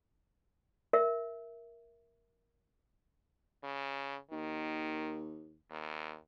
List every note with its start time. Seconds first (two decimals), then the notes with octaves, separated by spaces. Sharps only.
0.93 A#4 E5
3.63 C#3
4.31 D#2 D#3
5.71 D#2